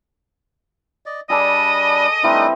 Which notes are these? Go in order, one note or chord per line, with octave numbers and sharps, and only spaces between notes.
D5 D#5
G3 D4 G#4 A4 D5 D#5 B5
E3 G3 A3 C4 D4 D#4